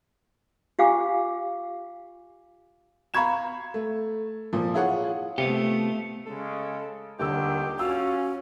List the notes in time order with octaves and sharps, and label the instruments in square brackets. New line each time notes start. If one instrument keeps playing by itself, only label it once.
[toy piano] F4 G4 F5 G#5 D6
[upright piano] F5 A#5 B5 C#6 G#6 E7
A3
A#2 F3
E4 F4 G#4 C#5 F#5
[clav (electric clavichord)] C3 [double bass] A3 [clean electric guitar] B3 F4 G4 [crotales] C#7 F7
[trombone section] C#3 G#3 [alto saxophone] A4
[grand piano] D#1 D3 E6 [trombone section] C#2 D#3 [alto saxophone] G4
[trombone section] C#4 [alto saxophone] F4 [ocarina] F#4 [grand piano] F5 E6